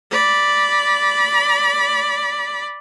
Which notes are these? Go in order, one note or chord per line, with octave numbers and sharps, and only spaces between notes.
D5 B5